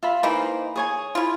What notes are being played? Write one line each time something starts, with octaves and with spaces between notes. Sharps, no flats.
F4 E5 B5
E3 A#3 D#4 C5 B5
G#4 C#5 G#5
E4 F4